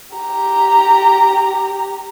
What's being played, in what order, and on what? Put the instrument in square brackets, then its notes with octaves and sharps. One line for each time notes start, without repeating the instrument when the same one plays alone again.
[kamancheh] G4 A#5